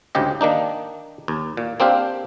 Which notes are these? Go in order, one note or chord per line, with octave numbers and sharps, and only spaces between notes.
D2 G#2 C#3 G4 D#5
D#3 A#3 D4 D#4
D#2
A#2
A#3 C4 D4 G4 F5